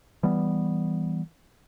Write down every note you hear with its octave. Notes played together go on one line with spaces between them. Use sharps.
E3 G3 B3